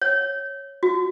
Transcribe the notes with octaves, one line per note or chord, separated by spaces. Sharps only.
C#5
F#4